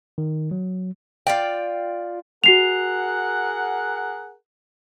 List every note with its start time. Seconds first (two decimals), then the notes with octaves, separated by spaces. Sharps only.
0.18 D#3
0.51 F#3
1.27 F4 D5 G5
2.44 F#4 G#4 A#4 F#5 C7 F7